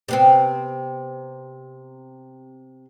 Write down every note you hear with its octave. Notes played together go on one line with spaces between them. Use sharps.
C3 B3 C4